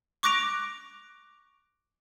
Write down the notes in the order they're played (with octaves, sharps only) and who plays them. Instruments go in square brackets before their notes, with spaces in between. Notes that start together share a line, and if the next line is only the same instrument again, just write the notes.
[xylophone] C#6 D6 F#6 A#6 D7 F7